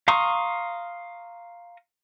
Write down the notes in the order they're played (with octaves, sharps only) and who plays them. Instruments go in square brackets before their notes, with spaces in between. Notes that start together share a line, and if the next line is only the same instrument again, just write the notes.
[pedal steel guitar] F5 A#5 C6 C#6 D#6